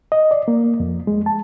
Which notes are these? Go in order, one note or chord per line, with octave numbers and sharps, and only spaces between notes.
D#5
D5
A#3
F2
G#3
A5